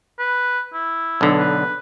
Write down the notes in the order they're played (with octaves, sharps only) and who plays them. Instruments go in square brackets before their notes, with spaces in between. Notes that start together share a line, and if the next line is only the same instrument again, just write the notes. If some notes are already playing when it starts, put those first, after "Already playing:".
[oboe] B4
E4
[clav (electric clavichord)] B1 D3
[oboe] B4